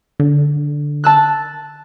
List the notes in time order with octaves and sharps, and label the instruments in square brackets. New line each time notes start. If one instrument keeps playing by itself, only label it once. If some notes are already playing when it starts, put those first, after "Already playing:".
[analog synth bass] D3
[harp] A5 E6 F#6